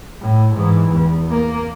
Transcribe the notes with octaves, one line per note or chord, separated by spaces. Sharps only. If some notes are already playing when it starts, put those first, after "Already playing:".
A2
G#2 E3
E2
A#3